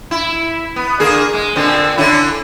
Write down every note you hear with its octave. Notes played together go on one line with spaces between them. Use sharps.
E4
B3
D3 A#3 G#4
G#3
A#2 D3 C4
D3 C#4 E4